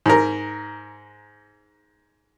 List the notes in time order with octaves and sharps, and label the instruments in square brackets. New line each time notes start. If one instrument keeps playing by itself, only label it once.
[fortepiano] G#2 A#4